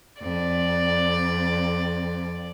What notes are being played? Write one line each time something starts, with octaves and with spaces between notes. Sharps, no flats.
F2 D5